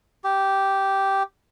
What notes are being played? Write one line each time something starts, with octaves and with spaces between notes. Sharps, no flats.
G4